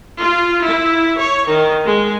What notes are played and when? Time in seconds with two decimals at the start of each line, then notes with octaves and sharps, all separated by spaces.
0.19 F4
0.62 E4
1.16 C#5
1.47 D#3
1.87 G#3